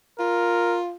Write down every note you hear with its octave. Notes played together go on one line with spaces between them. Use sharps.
F4 A#4